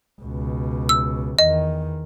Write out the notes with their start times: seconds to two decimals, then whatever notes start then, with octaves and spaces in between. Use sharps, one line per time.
0.21 C#2 B2
0.89 E6
1.39 E2 D#3 D#5